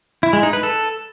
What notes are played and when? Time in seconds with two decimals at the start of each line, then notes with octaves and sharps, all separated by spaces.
0.23 E4
0.33 G#3
0.43 D#4
0.53 B4
0.63 A4